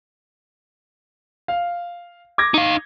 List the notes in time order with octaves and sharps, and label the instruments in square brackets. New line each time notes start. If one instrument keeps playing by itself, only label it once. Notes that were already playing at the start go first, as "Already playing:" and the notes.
[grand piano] F5
D6 G#6 A#6
[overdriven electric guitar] D#4 F5